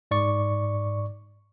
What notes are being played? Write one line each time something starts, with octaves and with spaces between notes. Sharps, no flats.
G#2 D5 C#6